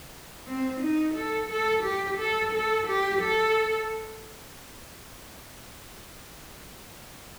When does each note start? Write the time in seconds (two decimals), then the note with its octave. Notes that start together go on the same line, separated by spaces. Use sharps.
0.46 C4
0.81 D#4
1.15 A4
1.49 A4
1.84 G4
2.18 A4
2.53 A4
2.88 G4
3.21 A4